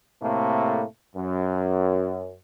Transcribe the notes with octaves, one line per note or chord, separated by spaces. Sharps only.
A2 C3 A3 A#3
F#2